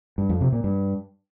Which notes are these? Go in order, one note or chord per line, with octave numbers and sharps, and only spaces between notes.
G2
F2
C3
A#2
G2